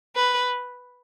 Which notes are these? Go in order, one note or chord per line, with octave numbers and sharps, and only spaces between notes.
B4